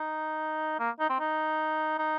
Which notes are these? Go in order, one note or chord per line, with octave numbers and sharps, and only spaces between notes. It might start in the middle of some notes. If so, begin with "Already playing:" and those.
Already playing: D#4
A#3
D#4
C4
D#4
D#4